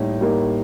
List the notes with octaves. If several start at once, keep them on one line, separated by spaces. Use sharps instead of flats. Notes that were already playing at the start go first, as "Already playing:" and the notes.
Already playing: A2 G3 A#3 D#4
G3 A#3 D#4